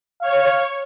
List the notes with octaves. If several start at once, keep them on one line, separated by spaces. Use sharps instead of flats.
C#5 F5